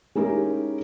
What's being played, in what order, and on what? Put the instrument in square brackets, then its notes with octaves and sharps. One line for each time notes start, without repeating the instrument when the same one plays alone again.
[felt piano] G#3 C#4 D#4 E4 G4 A#4